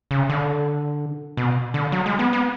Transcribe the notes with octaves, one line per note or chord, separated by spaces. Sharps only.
C#3
D3
B2
D3
F#3
G#3
B3
B3